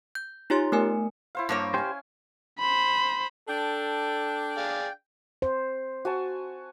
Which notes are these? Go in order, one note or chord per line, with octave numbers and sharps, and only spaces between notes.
G6
D#4 F4 G4 C#5 C6 A6
A3 B3 A#4 G#5
E4 C5 F5
G2 A#3 C#5
C#4 G4 C5 G#5
C5 B5
D4 A4 G5
G#4 D5 F5
C5
F#4 G#5 A5